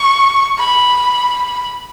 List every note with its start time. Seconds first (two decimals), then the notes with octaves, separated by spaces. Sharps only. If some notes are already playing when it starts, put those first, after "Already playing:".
Already playing: C#6
0.58 B5